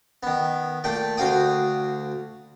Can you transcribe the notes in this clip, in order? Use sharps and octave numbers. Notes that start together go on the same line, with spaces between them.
D#3 B3
A#2 A3 G5
D2 F#4 F5 G5 D#6